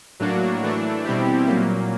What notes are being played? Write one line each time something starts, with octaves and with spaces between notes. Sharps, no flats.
A2 F#3 A#3 D4 F#4
E3 A3 D4
B2 G3 C4 E4 G4
A#2 F#3 A#3